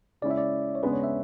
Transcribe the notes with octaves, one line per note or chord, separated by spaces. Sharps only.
C#3 G#3 C#4 E4 D5
E5
D5
C#5
C#3 G#3 B3 D4 B4
C#5
E5